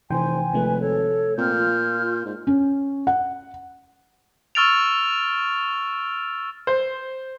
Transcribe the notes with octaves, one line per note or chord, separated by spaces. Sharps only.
F1 C3 E3 C5 G5 G#5 C6
G#1 C3 F3 A3 B4
A4 C#5
A#2 C4 F6 G6
F4
G#2
C#4
F#5
C#6 E6 F6 A6 D7 F7
C5